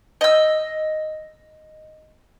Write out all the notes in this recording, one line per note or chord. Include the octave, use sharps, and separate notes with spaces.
D#5 E6